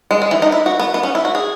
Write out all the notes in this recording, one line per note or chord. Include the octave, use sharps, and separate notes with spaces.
G#3
G#3
E3
D#4
E4
F#4
B3
B3
C#4
E4
F#4
G#4